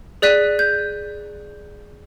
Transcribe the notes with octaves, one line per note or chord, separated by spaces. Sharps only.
G#4 D5 F#6 B6 D#7
G6